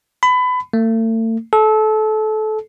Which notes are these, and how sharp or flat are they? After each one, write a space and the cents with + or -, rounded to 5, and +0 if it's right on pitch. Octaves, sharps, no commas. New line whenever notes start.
B5 +25
A3 +40
A4 -25